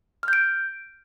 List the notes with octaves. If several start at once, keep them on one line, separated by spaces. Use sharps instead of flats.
F6 G6 D7